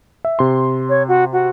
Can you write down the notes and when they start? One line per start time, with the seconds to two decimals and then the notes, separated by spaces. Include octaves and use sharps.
0.25 E5
0.39 C3 C6
0.89 C#5
1.08 F#4
1.33 F#4